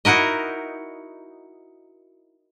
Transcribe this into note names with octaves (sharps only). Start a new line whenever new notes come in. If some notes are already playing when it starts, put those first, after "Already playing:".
D#4 E4 F#4 A#4 D#5